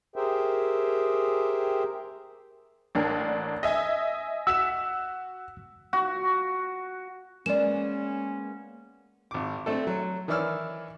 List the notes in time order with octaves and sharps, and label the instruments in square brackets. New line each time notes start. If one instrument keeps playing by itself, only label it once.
[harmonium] G4 G#4 A#4 C5 E5 G5
[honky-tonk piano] A1 D4 A#4
D#5 E5 G#5
[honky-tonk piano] F#4 B6 E7 [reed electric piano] E6
[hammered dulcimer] F#4
[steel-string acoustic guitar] G#3 A#3 B3 [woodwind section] C#4 [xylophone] D5 E7
[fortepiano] G#1 D6
A3 C4 D4 A4
F#3
D#3 E3 C#5 D5 E6 F6